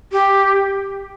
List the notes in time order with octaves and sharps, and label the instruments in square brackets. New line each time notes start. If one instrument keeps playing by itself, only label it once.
[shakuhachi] G4